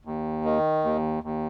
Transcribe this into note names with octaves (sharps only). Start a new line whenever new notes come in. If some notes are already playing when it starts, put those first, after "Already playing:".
D#2
D#3
D#2
D#2